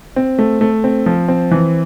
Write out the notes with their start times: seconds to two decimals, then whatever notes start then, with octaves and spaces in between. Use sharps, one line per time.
0.16 C4
0.39 A3
0.61 A3
0.84 C4
1.06 F3
1.28 C4
1.51 E3